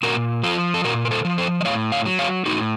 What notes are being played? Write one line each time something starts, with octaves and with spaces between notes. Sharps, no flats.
A#2 F#4 A#4
F3 F4 A4
A4
A#2 F#4 A#4
A#4
A4 C5
F3
A4 C5
D#5
A2 C#5 F5
C#5 F5
F#3
C#5 F5
A2 D#4 F#4